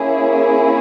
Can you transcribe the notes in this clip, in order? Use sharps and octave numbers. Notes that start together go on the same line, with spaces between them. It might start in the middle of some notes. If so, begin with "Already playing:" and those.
Already playing: A#3 C#4 E4 G#4